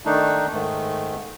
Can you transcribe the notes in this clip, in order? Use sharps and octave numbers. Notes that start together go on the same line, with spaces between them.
D#3 A3 D4 D#4
G#2 D#3 A3